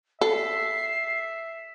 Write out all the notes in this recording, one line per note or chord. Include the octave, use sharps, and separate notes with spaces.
A4 E5 C7